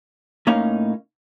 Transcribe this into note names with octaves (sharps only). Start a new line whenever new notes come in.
A2 A#3 C#4 D#4 C#5 F5